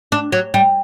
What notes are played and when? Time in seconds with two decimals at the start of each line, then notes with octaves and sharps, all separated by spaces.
0.12 D4
0.32 F#3
0.54 G3